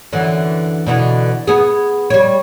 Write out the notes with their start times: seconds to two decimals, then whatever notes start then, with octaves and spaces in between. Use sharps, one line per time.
0.12 F#2 D3 E3
0.86 B2 D3 E3
1.47 B3 G#4
2.10 G3 C#5